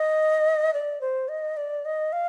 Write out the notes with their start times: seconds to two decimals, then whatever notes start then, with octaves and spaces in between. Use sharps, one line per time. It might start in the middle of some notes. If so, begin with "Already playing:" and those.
Already playing: D#5
0.74 D5
1.01 C5
1.28 D#5
1.57 D5
1.85 D#5
2.12 F5